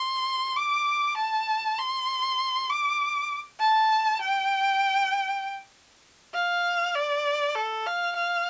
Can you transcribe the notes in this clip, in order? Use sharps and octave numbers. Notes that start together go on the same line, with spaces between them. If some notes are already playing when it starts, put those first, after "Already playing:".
Already playing: C6
D6
A5
C6
D6
A5
G5
F5
D5
A4
F5
F5